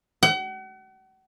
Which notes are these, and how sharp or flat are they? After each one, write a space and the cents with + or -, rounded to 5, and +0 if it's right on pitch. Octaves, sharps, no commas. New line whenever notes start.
F#5 +40